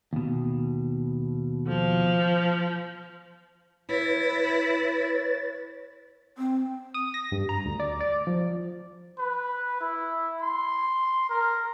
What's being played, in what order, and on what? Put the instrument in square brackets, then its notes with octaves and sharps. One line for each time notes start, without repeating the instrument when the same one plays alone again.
[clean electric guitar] D#2 B2
[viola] F3
[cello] E4 [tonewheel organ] B4 C#5 A6
[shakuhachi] C4
[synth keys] D#6
A#6
G2
A#5
D2
D5
D5
F3
[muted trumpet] B4
E4
C6
A#4